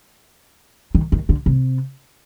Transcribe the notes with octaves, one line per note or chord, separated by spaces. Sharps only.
D#3
D#3
D3
C3